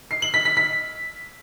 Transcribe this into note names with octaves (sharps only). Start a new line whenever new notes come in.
C7
F#7
B6
B6
B6